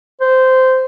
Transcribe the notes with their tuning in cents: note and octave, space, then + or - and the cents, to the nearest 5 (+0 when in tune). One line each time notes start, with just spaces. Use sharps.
C5 -15